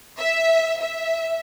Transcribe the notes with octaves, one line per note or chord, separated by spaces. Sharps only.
E5
E5